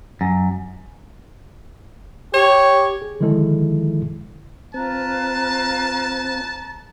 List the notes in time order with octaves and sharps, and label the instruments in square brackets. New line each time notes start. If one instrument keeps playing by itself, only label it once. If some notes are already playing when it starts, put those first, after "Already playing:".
[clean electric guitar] F#2
[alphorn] G4 [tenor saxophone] C#5
[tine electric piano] G#4
D3 D#3 F3 G#3 E4 A4
[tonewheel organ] C4 [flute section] F4 B4 F#6 [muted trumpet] A5 [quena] A#5